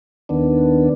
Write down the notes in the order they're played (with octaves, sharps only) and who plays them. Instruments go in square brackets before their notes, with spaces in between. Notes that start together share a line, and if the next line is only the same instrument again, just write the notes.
[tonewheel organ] D#2 D#3 B3 D4